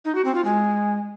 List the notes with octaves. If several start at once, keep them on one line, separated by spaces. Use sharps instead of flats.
D#4
F#4
C4
F4
G#3